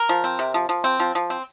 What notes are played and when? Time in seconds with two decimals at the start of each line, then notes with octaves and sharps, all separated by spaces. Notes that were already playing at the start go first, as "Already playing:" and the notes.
Already playing: A#4
0.09 F3
0.24 C4
0.39 C3
0.54 F3
0.69 F3
0.84 C4
1.00 F3
1.15 F3
1.30 C4